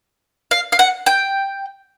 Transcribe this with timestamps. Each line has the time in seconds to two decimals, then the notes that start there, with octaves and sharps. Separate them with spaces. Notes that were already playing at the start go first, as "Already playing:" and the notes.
0.51 F5
0.72 F5
0.79 F#5
1.06 G5